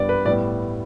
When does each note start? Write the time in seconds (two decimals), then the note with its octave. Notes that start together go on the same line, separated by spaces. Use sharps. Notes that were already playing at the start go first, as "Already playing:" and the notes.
Already playing: G2 G3 B3 D5
0.09 B4
0.25 A2 G3 B3 D5